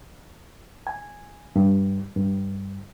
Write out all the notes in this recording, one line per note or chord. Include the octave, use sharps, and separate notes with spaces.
G#5
G2
G2